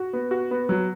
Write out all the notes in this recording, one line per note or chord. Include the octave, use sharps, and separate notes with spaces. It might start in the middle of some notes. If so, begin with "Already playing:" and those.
Already playing: F#4
B3
F#4
B3
F#3